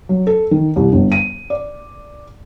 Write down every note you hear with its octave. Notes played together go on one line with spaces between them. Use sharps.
F#3
A4
D#3
C2
G1
D#7
D5